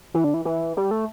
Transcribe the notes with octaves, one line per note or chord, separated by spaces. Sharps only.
E3
D3
E3
E3
G3
A3